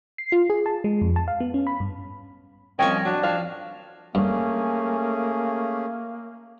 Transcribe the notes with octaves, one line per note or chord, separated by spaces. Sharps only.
C7
F4
G#4
A5
G#3
F2
A5
F5
B3
C#4
B5
G2
C2 F3 C#4 D#5 G5 G#5 C#6
F#3 D4
F3 F5
G2 A3 A#3 C#4 G#4